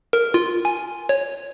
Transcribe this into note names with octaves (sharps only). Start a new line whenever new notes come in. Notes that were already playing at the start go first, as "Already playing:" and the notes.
A#4
F4
G#5
C#5